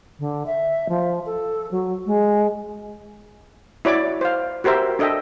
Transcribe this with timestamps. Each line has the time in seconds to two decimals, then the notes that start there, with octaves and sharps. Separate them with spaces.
0.19 D3
0.46 E5
0.89 F3
1.26 A4
1.71 F#3
2.06 G#3
3.85 E4 F#4 C#5 D5 B5 D6
4.21 C5 F5
4.64 F#4 G4 A#4 C5 E5
4.99 D4 A4 D#5 E5 G5